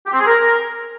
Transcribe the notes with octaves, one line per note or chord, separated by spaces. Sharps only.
G4
C4
G#4
A#4